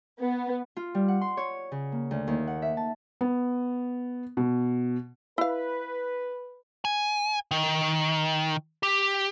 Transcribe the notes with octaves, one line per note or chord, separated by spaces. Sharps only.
B3
F4
G3
F#5
C6
C#5
C#3
A#3
D2
D#2
F#5
E5
A5
B3
B2
E4 B4 F5
G#5
D#3
G4